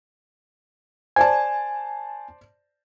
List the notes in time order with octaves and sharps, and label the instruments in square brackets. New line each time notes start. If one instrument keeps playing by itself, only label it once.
[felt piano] C5 D5 A5 [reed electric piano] G#5